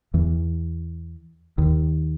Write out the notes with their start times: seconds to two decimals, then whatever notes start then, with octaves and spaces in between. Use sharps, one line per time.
0.14 E2 E3
1.58 D#2 D#3